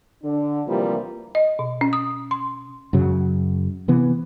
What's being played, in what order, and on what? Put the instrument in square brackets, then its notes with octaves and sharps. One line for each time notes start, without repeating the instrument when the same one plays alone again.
[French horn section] D3 D4
D2 C3 E3 F3 G3 A#3
[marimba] D#5
B2
C#4
D#6
C6
[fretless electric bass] F#2 C#3 F#3
C3 E3 B3